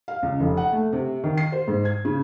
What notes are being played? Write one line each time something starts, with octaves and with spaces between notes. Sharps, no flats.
F5
C#2
F1
F#5
A3
C3
D#3
C7
C5
G#2
G#6
C#3